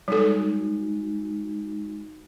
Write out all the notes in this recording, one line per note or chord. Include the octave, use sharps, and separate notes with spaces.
G3 G#3 D#4 F#4 A4